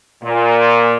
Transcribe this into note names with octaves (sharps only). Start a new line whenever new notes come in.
A#2